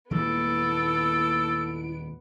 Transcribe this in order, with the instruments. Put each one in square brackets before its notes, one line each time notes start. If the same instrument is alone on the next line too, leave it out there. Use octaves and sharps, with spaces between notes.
[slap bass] D#2 A#2 G#3 [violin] B3 D7 [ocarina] E4 [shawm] A4